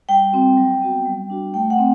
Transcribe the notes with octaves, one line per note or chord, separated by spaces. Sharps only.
G3 G5
C4 F#4
F#3
B3 F#4
G3
D4 F#4
A3 G5
F#5
C4